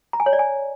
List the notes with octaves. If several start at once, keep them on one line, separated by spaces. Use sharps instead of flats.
A#5
G#5
C#5
D5
G#5